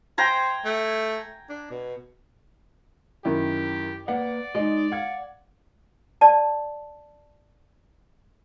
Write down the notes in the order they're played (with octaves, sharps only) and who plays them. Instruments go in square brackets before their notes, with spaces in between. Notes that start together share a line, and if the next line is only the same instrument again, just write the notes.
[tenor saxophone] C5 [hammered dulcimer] G5 G#5 A#5
[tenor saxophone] A3
D4
B2
[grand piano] F#2 D#3 E4 [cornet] G4
[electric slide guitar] A#3 B4 F5 [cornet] D5 [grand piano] F#5
[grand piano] G#3 [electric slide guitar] D#4 D#5
[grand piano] F5 G#6 [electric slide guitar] F#5
[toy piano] D5 A5